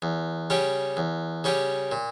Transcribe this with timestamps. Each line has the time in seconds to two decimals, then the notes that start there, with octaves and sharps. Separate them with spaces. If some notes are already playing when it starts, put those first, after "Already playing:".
0.02 E2
0.50 C#3 G3 C#4 G4
0.97 E2
1.44 C#3 G3 C#4 G4
1.92 A#2